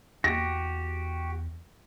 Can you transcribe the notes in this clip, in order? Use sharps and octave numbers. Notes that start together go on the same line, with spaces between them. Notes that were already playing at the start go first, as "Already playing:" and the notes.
E2 F#4 G4 A#6